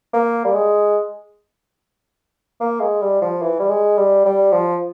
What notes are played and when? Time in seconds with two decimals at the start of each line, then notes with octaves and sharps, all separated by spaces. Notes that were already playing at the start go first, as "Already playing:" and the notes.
0.13 A#3
0.45 G3
0.54 G#3
2.61 A#3
2.80 G#3
3.02 G3
3.22 F3
3.42 E3
3.60 G3
3.70 G#3
3.98 G3
4.25 G3
4.52 F3